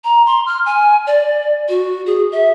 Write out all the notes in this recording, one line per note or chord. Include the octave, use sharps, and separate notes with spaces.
A#5
C6
F6
G#5
D5
F#4
G#4
E5